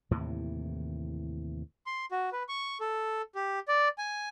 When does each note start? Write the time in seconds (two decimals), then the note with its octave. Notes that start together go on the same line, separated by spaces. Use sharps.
0.11 D#2 A2 C3 E3
1.86 C6
2.11 F#4
2.32 B4
2.49 C#6
2.80 A4
3.35 G4
3.68 D5
3.98 G#5